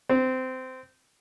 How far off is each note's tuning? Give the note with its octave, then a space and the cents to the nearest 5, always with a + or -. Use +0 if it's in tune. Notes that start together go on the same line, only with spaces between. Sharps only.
C4 -20